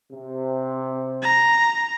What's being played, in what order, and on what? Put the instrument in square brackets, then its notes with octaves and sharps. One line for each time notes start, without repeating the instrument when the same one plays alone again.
[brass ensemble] C3
[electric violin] A#5